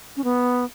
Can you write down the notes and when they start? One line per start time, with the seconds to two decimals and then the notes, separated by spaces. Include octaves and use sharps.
0.17 C#4
0.24 B3